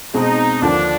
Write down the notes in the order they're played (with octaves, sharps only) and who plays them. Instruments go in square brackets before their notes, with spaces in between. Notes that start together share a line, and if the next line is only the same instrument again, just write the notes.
[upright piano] B2 G#3 C4 [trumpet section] D#4
[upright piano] D#2 D3 F3 [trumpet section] D4